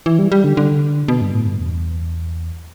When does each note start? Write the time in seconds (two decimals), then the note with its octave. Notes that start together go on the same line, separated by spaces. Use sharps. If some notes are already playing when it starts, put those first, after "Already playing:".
0.06 E3
0.19 G3
0.32 G3
0.44 D3
0.57 D3
1.08 B2
1.21 G2
1.34 A2
1.46 G2
1.59 E2